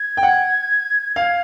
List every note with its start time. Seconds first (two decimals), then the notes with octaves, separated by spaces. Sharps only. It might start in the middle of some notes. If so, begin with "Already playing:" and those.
Already playing: G#6
0.17 G5
0.23 F#5
1.16 F5